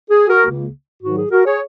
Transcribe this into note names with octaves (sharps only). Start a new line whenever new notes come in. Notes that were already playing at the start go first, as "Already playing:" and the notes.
G#4
F#4 A#4
C#2 C#3 A#3
G#2 D#3 F#3 F#4
G#4
F#4 A#4
G#4 C#5